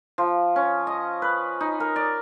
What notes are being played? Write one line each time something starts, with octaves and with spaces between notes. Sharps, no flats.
F3
C#4
D#5
B4
D#4
A#4
D5